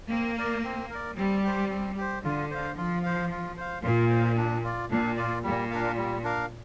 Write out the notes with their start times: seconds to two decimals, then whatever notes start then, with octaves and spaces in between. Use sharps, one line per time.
0.10 A#3 C4
0.37 A#4 D5
0.64 C4
0.90 A#4 D5
1.16 G3 C4
1.44 G4 C5
1.70 C4
1.97 G4 C5
2.24 D3 F4
2.51 C5 F5
2.77 F3 F4
3.03 C5 F5
3.31 F4
3.57 C5 F5
3.84 A#2 F4
4.10 C5 F5
4.37 D4
4.64 F4 D5
4.91 A#2 D4
5.17 F4 D5
5.43 A#2 G3
5.70 D4 A#4 F5
5.97 G3
6.24 D4 A#4 F5